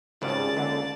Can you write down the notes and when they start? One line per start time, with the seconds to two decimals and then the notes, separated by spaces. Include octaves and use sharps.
0.22 G#1 C#2 G2 C#3 D5 A5
0.57 D#2 D3